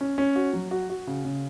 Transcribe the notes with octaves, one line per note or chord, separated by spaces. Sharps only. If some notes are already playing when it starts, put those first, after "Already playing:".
C#4
C#4
F#4
F#3
F#4
F#4
C#3
C#3